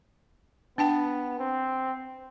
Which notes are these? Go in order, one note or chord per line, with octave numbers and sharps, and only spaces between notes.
B3 D4 G5 A5
C4